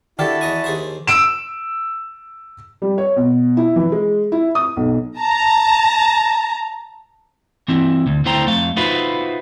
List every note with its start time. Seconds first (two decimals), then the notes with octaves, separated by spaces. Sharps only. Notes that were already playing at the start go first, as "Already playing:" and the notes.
0.19 D#3 D4 E4 F#4 G4 A4 A5
0.41 E2 D#5 G#5
0.64 D#2 G#4 C5
1.07 E6 D7 E7
2.82 G3
2.98 C#5
3.16 B2
3.57 E4
3.76 E3
3.92 G#3
4.32 E4
4.55 D#6
4.77 B1
5.19 A5 A#5
7.68 E3 C4 E4
8.07 D2
8.25 D2 A3 E4 C5 G5 A#5
8.46 F2 A3 F5
8.76 D#4 F4 F#4 B4 C5 E5